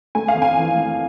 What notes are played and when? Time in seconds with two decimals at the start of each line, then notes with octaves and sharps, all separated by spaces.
0.15 A3 G#5
0.28 F5
0.35 F2
0.42 G#5
0.55 E3
0.76 A3